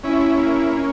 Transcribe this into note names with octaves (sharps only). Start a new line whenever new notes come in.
C#4 E4
A#3
C#4